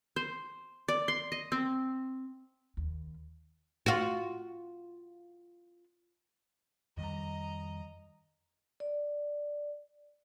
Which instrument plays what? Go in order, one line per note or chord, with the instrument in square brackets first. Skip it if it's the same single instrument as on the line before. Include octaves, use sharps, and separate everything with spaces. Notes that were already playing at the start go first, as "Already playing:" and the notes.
[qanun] C5
D5
C6
D#5
C4
[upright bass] D#2
[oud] F4 F#4
[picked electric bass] F2 D#3 G3 [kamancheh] D#5 A#5
[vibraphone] D5